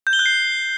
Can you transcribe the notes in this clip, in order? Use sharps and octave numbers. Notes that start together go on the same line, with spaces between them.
G6
G7
F#6
C7